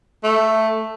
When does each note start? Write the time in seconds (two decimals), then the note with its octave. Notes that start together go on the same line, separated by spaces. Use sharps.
0.24 A3